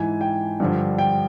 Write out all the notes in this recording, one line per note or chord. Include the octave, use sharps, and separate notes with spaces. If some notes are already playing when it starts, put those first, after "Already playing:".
Already playing: G#2 E3 G#5
G5
G2 D3 F3
G5